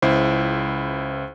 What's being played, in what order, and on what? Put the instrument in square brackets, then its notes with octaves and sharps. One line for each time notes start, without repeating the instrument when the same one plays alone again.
[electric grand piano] C#2 E4 C5